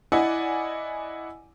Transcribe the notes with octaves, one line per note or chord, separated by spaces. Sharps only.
E4 D5 D#5 F#5 G#5